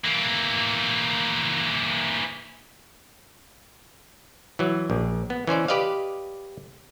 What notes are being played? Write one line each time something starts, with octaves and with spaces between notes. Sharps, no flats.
E3 A#3
E3 F#3
A#1
B3
E3 C#4 C5 D5
G4 B4 D5 D#5 F5